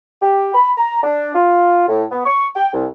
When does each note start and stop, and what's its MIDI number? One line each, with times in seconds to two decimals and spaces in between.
0.22 0.54 67
0.55 0.72 83
0.78 1.01 82
1.03 1.31 62
1.35 1.84 65
1.88 2.04 45
2.12 2.21 59
2.26 2.47 85
2.56 2.69 79
2.73 2.86 36